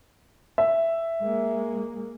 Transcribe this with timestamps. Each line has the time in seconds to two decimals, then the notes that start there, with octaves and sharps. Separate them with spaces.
0.58 E5
1.23 G#3 A#3